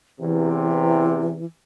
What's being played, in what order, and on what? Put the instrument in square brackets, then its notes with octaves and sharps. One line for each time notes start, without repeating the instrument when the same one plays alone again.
[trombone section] E2 C3 [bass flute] E3